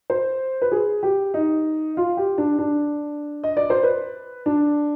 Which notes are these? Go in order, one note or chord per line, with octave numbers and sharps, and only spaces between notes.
C5
B4
G#4
G4
D#4
F4
G4
D4
D4
D#5
D5
C5
B4
D4